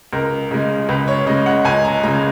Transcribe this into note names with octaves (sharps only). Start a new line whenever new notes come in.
C#2 A#4
C#3 G#3
C#2 B4
C#5
C#3 G#3 D#5
F#5
C#2 G#5
A#5
C#3 G#3 A#5